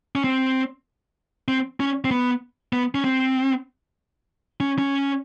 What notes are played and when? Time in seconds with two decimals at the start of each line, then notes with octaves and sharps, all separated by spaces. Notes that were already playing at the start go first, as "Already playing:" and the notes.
0.15 C#4
0.24 C4
1.48 C4
1.80 C#4
2.05 C4
2.11 B3
2.73 B3
2.95 C#4
3.05 C4
4.60 C#4
4.79 C#4